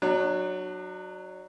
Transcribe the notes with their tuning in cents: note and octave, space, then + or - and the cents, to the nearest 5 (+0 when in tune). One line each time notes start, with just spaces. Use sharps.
F#3 +0 D4 +40